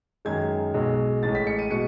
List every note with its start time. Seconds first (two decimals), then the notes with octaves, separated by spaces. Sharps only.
0.25 F#2 D#3 G#3 G#6
0.74 B1 B2 G#3
1.23 A1 A2 G#3 A6
1.35 B6
1.47 C#7
1.59 D#7
1.70 B2 G#3 C#7